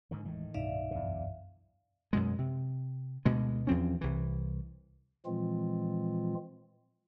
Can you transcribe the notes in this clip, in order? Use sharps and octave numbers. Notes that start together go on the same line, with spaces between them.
G#2 D3 D#3
E1 A2 D#3 E3 G#3
C2 G2 B2 D#4 D5 E5 F5
E2 D3
F#2
F#2 B2 G#3
C3
D2 B2 G#3
E2 F3 C4 C#4
C2 E3
A#2 E3 F3 G#3 C4 F4